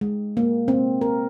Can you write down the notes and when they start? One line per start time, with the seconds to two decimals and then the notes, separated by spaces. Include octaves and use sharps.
0.01 G#3
0.37 A#3
0.68 C4
1.01 A#4